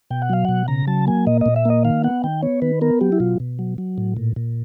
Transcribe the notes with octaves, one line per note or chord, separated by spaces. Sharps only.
B2 G5
F#5
F#3 F5
B2 F#5
C#3 A#5
F#3 A5
A#3 G#5
A#2 D#5
A#2 D#5
E5
A#3 D#5
D#3 F5
B3 F#5
D#3 G5
B3 C#5
D#3 B4
B3 A#4
F#3 G4
E4
B2 F4
B2
F#3
F#3
A2
A#2
A#2